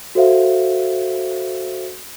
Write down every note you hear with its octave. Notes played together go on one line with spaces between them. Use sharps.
F#4 A4 C5 E5 F5